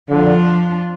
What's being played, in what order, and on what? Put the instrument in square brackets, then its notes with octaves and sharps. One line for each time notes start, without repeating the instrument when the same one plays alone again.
[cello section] F2 F3 D4 F4 [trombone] D3